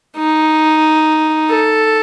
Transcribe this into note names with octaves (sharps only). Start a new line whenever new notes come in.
D#4
A4